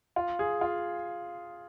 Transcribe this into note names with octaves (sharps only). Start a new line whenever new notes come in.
F4
G#4
F4